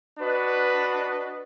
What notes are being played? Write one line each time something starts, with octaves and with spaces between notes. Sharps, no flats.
D4 F#4 B4 D#5